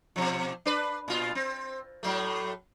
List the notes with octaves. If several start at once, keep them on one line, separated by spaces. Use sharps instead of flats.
B2 F3
D4 B4
A#2 F4
C4
A2 F#3 A3